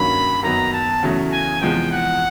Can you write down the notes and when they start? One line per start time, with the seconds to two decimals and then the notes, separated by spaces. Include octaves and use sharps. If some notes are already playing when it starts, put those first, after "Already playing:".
Already playing: G2 D#3 F#3 A#3 C#4 B5
0.43 F#2 D#3 F#3 B3 A#5
0.73 A5
1.03 E2 C#3 F#3 A3
1.32 G#5
1.61 E2 C3 F3 G#3 B3 G5
1.91 F#5